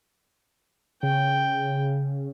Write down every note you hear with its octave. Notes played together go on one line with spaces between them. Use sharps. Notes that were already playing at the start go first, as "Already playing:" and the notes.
C#3 G5